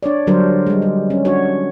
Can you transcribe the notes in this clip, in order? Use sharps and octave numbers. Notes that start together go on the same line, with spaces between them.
D4 C#5 D5
D3 F#3 G3 D4 A#4 C5
G3 G#3
G3
C#4
D4 F#4 C#5